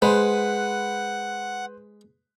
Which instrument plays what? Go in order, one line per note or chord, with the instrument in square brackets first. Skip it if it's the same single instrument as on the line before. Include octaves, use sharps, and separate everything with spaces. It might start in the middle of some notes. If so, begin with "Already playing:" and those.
[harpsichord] G#3 [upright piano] B4 C5 [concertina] F#5